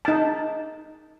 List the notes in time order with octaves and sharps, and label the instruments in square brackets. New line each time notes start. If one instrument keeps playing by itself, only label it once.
[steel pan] D#4 A5